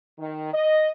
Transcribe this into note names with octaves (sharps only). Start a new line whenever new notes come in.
D#3
D#5